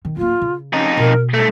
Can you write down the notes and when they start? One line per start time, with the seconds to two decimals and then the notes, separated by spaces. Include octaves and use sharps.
0.05 D#3
0.17 D1 A#3 F4
0.41 C#3
0.73 F2 C#4 D#4
0.97 B2 A#4
1.34 G2 A3 A4